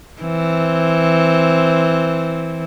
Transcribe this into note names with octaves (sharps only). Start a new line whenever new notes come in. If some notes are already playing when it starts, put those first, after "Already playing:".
E3 C4